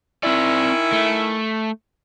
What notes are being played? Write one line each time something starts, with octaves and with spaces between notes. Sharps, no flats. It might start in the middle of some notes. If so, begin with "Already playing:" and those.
D#3 C4 C#4 E4 D5
A3